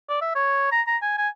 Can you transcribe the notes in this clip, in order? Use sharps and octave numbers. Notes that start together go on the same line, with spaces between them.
D5
E5
C#5
A#5
A#5
G#5
G#5